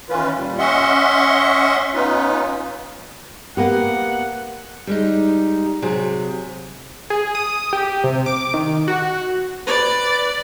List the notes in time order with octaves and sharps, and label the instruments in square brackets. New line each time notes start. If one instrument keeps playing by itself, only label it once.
[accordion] D#3 E3 C#4 F4 B4
A#2 G3
C#4 D#5 E5 F#5 C6 C#6
B3 C#4 D#4 F4 B4
[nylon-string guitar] A#3 B3 G4 [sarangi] F#5
[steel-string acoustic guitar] G3 G#3 D#4
C3 F#3 G#4
[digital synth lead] G#4
D#6
G4
C3
D6
D#3
F#4
[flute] B4 [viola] D5